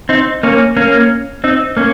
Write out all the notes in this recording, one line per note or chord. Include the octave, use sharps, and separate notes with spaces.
C4 D#4
A#3 C#4
A#3 C#4
C4 D#4
A#3 C#4